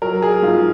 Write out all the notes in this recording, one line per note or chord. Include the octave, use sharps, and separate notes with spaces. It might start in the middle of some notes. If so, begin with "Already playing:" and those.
F#3 A#4
G#4
G#2 F4